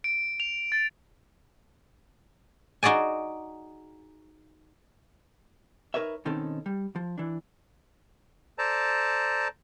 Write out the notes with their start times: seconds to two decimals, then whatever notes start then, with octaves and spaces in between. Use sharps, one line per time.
0.04 D7
0.40 F7
0.72 A6
2.83 D#4 F#4 G#4 D5 G#5
5.94 D#4 A#4 B4 C#5 E5
6.25 B2 D#3 C4 C#4 D#4 A4
6.66 G3
6.96 F3
7.18 E3 D4
8.58 A4 C5 D5 A5 A#5